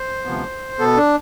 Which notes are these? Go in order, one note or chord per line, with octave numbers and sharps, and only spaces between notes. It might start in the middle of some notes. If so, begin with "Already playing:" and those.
Already playing: C5
D2 C3 F3 B3
B2 B3 A4
D4